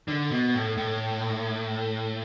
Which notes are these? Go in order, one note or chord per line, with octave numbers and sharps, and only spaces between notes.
D3
B2
A2
A2